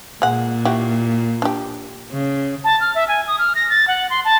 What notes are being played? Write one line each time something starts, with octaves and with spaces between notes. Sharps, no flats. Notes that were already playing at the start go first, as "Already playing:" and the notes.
A#2 G#3 F#5
E4 F#4 G4
D4 G4
C#3
A5
F6
E5
G#5
D#6
F6
A#6
A6
F#5
C6
A5